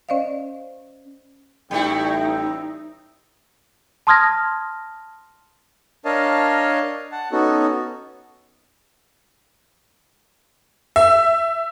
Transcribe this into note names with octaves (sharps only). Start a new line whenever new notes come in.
C#4 C5 D5 D#5 F5
A1 G3 A3 D#4 E4 G5
A5 C6 D#6 F6 G#6 A#6
D4 A#4 C#5 D#5 F5 A5
F#5 A5
B3 C#4 D#4 F#4 A4
E5